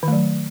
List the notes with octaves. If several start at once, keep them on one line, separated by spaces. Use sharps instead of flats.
D#3 F#3 A3